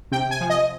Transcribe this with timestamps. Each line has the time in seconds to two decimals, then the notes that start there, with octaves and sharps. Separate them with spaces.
0.12 C3 G5
0.31 G#5
0.41 F3
0.50 D#5